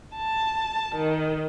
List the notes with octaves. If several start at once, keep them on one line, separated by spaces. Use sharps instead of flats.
A5
D#3